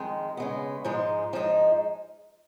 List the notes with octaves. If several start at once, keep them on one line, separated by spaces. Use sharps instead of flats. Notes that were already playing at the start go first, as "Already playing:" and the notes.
Already playing: F2 D#3 G#3
C#3 G#3 B3
G#2 F3 G#3 D#4
G#2 F3 G#3 D#4